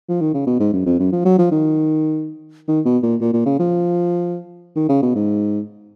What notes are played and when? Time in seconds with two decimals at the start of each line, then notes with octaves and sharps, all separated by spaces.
0.09 F3
0.21 D#3
0.34 C#3
0.47 B2
0.60 G#2
0.73 F#2
0.86 F2
0.99 F#2
1.12 F3
1.25 F#3
1.39 F3
1.52 D#3
2.68 D#3
2.86 B2
3.03 A#2
3.21 A#2
3.33 A#2
3.46 C#3
3.59 F3
4.76 D#3
4.89 C#3
5.02 B2
5.15 G#2